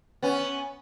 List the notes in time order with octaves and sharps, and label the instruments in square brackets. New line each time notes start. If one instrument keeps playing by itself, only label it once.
[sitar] B3 C#4